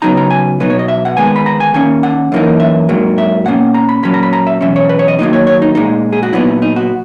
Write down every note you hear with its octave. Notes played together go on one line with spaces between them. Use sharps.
C#3 F#3 B3 D#4 A#5
A#5
G#5
B2 F#3 B3 D#4 B4
C#5
D#5
E5
F#5
D#3 G#3 B3 G#5
B5
A#5
G#5
D#3 A#3 C#4 G#5
F#5
F#2 E3 A#3 D#4
E5
G#2 F#3 A#3
E5
B2 A#3 C#4 F#5
A#5
B5
A#2 F#3 C#4 B5
A#5
B5
A#5
E5
E2 B2 F#3 C#4 E5
C#5
B4
C#5
D#5
D#3 F#3 A#3 D#4 D#5
C#5
C#5
D#4
A#2 G#3 D#4
G#4
F#4
A#2 F#3 B3 D#4 E4
D#4
F#4